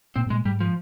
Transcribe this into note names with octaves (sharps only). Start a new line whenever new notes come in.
A#2 C4
G#2
A#2 G#3
G#2 G3
F3